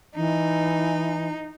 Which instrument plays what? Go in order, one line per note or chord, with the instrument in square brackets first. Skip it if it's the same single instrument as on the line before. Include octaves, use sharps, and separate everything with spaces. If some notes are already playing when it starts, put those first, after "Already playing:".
[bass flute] E3 [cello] D#4